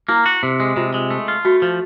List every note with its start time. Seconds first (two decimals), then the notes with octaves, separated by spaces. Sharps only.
0.09 A#3 E4
0.26 F#4
0.43 C3
0.60 G#3
0.77 C3 F4
0.94 G#3
1.11 A3
1.28 F4
1.45 A3 F#4
1.62 F3